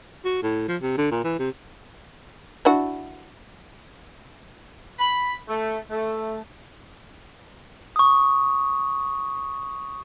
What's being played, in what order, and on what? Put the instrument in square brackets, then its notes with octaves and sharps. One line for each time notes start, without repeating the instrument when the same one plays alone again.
[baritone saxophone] F#4
A2
F3
C3
D3
A#2
E3
C3
[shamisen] D4 E4 F#4
[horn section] B5
A3
A3
[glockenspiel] C#6 D#6